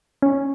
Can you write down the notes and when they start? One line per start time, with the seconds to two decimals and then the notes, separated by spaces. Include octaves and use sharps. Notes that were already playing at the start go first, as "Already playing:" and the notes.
0.22 C#4